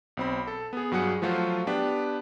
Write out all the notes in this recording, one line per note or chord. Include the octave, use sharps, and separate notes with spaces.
B1 C4 B5
A4
B3 G#4
G2 F#3 G#4 F#5 C#7
F3 F#3 A3 F4 F#4 C5
B3 D4 G4 B4